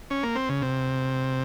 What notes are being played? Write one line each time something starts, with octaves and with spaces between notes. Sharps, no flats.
C#4
A#3
C4
C#3
C3